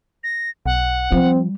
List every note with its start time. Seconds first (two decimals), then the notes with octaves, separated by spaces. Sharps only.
0.24 A#6
0.66 B1 F#5
1.12 F3 G3 C4